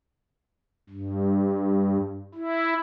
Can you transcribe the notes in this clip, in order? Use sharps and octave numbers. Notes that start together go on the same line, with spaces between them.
G2
E4